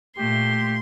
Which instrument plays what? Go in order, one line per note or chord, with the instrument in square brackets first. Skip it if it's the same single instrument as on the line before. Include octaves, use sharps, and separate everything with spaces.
[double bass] A#2 [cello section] A3 [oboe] G4 [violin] C6